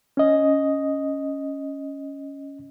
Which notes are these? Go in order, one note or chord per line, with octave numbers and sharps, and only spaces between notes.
C#4 D#5